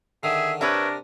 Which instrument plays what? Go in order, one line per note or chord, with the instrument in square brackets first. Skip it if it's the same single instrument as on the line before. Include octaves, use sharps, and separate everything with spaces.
[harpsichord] D3 D#3 [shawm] G#4 [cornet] E5
[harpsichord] C3 [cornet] D4 [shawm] A#4 [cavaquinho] B4 C#5 E5